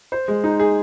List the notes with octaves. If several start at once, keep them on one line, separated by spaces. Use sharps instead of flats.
C5
G#3
D#4
G#4